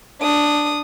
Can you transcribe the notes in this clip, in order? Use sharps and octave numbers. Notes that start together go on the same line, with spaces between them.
D4 D#6